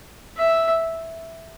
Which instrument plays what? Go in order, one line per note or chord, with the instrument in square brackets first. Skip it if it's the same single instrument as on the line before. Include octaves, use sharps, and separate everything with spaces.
[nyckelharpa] E5